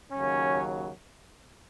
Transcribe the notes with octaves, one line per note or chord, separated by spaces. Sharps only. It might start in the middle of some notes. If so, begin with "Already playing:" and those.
D#2 C#3 F#3 C#4